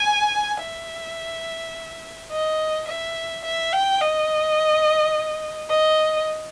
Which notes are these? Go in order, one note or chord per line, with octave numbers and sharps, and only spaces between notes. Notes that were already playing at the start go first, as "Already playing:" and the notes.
Already playing: G#5
E5
D#5
E5
E5
G5
D#5
D#5